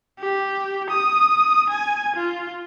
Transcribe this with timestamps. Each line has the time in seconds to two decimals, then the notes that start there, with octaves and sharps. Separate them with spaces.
0.19 G4
0.90 D#6
1.70 G#5
2.16 F4